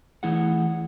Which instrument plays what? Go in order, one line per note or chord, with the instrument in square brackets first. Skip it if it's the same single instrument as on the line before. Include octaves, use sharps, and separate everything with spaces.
[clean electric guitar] E3 A3 E4 G#4 F#5